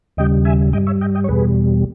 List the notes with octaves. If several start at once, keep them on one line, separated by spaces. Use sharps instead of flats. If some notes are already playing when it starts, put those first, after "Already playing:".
D#2 C#3 G3 D#5 G5
E5 G#5
G2 G3 D#5 G5
C#5 E5
D#5 G5
D#5 G5
C#5
E2 B2 G3 G#4 B4